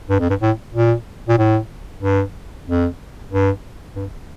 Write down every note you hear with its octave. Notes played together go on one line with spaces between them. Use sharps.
G2
F2
G2
A2
A#2
A#2
A2
G2
F2
G2
G2